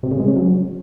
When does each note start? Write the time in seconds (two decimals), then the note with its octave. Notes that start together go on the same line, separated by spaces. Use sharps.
0.03 C3
0.11 C#3
0.20 G#3
0.28 C#4
0.36 F#3